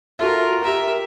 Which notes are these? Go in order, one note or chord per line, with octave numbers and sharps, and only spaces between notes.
F4 F#4 A4 A#4 E5
G4 A#4 E5 A#5